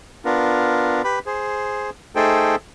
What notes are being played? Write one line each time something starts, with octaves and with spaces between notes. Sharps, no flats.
B3 D4 F4 A#4
G4 B4 B5
G#4 C5
A3 D#4 G#4 A4 C5 G5